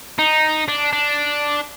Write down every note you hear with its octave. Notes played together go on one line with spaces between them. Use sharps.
D#4
D4
D4